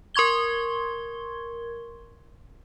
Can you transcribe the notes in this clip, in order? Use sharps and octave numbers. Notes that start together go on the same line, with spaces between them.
A#4 C6 C#6 G#6 G7